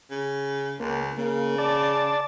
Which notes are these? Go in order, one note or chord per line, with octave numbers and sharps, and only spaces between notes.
C#3
C#2 A#3
C#3 A#3
D5 A5